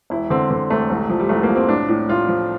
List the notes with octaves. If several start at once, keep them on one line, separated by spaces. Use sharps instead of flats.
E1 E4
D3 C4
D3 C4
E1 A3
C2
F3
G3
C2 A3
A#3
F3
C4
A2 D4
A2
A2 F4
F3